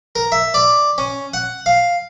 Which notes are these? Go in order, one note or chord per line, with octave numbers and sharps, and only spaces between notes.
A#4
E5
D5
C#4
F#5
F5